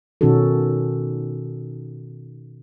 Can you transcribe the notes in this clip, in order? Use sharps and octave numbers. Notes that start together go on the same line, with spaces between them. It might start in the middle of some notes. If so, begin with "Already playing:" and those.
B2 D#3 C#4 D#4 F#4 A4